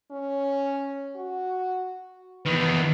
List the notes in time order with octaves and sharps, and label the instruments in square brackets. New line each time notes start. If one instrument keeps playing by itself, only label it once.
[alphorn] C#4
F#4
[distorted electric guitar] E2 D#3 [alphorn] B4